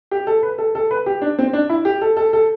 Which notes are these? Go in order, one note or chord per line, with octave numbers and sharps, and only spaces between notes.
G4
A4
B4
A4
A4
B4
G4
D4
C4
D4
E4
G4
A4
A4
A4